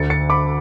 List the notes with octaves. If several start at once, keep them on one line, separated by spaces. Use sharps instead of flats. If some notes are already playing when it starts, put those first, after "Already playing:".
Already playing: D2 D3 A6 C#7
A6 C#7
B5 D6